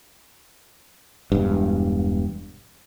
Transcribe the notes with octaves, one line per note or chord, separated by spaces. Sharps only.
E1 G2